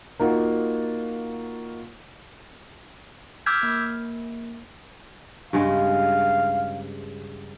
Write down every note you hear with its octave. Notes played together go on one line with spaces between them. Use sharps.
A#3 D#4 F4 F#4
D6 E6 F6 G6 G#6 B6
A#3
G2 C#3 G#3 F5